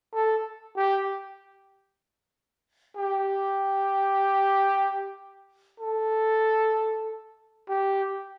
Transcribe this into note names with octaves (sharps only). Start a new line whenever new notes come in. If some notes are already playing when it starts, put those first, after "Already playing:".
A4
G4
G4
A4
G4